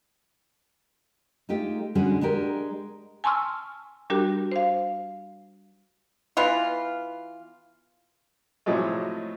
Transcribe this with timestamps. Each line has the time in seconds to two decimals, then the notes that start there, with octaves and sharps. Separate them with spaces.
1.49 G#3 A3 D#4 F4 G4
1.95 D3 G3 G#3 C#4 F#4 G#4
2.21 G#3 D4 G4 A#4
3.24 G#5 A5 C6 C#6 E6 F6
4.10 G3 D4 F#4 G4 A#4
4.52 C5 F5
6.37 E3 B3 F4
8.66 A2 C3 F3 F#3 G#3 A3